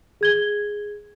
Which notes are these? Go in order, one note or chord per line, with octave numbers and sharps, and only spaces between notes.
G#4 G#6 G7